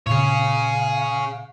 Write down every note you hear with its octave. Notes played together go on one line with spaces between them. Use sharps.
A#2 C#3 G#4 C#5 F5